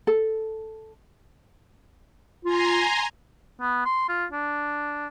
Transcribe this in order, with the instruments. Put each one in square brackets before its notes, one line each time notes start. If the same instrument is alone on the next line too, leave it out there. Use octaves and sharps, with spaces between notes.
[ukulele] A4
[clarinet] F4 [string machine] G#5 A#5 C6
[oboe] B3
C6
F4
D4